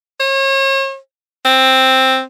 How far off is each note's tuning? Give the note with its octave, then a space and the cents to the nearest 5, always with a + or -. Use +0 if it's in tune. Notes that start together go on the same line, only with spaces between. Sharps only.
C#5 -40
C4 +5